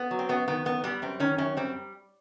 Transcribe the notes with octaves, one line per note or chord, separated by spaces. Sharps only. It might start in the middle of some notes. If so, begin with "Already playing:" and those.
Already playing: B3
F#3
C4
F#2 B3
D#3 B3
F#2 B3
G3 B3
F#2 C4
D#3 C#4
F#2 C#4
G3 C4